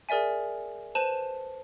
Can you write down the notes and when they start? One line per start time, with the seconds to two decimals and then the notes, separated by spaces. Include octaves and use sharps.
0.09 G#4 A#4 D5 E5 G#5
0.95 B4 C5 A5 D#7 E7 F#7